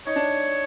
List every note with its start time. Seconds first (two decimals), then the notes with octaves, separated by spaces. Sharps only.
0.07 D#4 C#5
0.16 D4